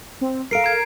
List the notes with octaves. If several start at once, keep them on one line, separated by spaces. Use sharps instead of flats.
C4
A4 A#4 F5 C7 D7
A#5 G#6